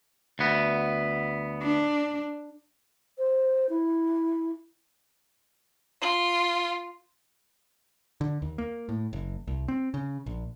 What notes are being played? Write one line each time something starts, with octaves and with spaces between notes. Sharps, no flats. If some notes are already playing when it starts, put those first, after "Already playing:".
D2 B3
D4
C5
E4
F4
D3
D#2
A#3
A2
F#1
C2
C4
C#3
A#1